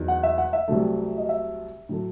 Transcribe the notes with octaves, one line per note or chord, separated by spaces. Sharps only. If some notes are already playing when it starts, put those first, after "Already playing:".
Already playing: E2 D#3 F#3
F#5
E5
F#5
E5
C2 C3 F#3 A3
D#5
E5
A2 F#3 A3